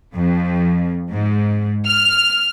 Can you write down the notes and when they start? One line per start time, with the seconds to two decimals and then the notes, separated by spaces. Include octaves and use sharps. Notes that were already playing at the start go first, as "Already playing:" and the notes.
0.14 F2
1.10 G#2
1.85 F6